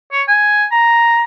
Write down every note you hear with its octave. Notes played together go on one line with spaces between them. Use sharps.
C#5
G#5
A#5